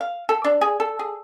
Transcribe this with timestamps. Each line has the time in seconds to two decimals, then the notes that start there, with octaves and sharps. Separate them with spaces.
0.01 F5
0.29 A4
0.44 D4
0.61 G#4
0.80 A4
0.99 G#4